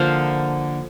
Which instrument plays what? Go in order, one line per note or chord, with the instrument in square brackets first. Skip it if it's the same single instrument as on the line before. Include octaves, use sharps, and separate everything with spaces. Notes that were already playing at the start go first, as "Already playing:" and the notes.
Already playing: [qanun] D3 F3 A#3 C5 F5